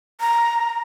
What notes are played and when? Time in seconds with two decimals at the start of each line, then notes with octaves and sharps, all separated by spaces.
0.20 A#5